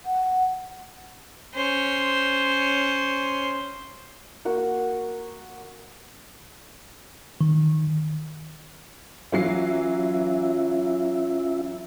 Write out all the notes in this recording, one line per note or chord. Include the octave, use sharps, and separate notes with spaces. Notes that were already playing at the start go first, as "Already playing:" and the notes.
F#5
C#4 C5
A#3 F#4
D#3
E3 F#3 C#4 F4 E5 C7